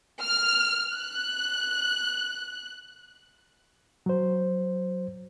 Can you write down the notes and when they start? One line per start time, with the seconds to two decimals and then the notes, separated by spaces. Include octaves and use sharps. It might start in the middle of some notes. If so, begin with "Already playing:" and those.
0.22 F6
0.95 F#6
4.06 F#3 C5